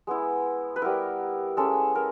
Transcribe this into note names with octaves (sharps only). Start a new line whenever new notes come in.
G#3 B3 E4
B4
G3 B3 E4 A#4
G#3 C#4 E4 A4
A#4